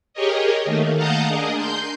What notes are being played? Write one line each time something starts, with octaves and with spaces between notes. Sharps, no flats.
G4 G#4 A#4 C#5 D#5
D#3 A3 A#3
F5 F#5 A5 A#5 D#6 G6
D4 G#4 A#4 D#5
C6 G6